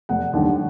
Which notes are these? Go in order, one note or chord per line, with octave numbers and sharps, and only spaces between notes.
F1 F#5
D#2 D3 G3